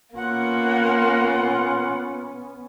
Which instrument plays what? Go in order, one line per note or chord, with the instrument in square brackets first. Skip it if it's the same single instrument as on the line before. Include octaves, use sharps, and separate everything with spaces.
[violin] A#3 [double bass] B3 C#4 [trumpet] F4 [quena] F#5